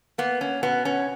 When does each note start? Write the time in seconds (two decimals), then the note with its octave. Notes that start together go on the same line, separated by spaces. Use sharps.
0.18 A#3 B3
0.41 C#4
0.63 B2 B3
0.85 C#4